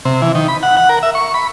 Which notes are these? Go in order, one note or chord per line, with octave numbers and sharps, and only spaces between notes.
C3
E3
D#3
B5
F#5
F#5
A#4
E5
C#6
B5